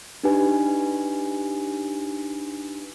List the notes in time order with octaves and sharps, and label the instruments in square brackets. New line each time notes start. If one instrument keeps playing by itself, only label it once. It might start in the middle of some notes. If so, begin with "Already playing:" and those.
[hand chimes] D4 D#4 G4 B4 G#5